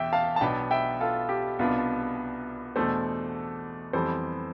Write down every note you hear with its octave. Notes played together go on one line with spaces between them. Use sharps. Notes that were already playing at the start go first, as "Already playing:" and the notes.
Already playing: E2 B2 E5 G5
F5 A5
A5
B1 B2 B3 D4 G5 B5
E5 G5
F4 A4
G4
C2 B2 B3 D4 F4
E2 B2 A3 D4 A4 C5
F2 E3 G3 B3 A4 C5